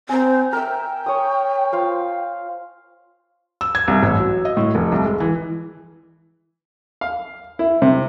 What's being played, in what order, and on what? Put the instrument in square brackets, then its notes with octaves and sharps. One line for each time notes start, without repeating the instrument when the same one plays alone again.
[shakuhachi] C4 [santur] G#5 A#5
[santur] A#4 E5 [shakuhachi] G5
[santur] C#5 D#6
F4 C5 F5
[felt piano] E6
G#6
C2
A1
F#3
D#5
A2
F1
C2
G#3
E3
[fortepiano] F5
E4
C3